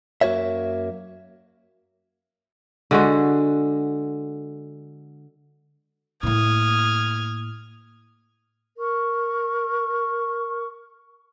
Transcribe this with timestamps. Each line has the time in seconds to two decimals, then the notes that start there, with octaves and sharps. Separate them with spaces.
0.21 F#2 A#3 F#4 C5 C#5 E5
2.91 D3 G#3 F#4
6.23 A2 A#3 D#6 F6 G#6
8.78 A#4 C#6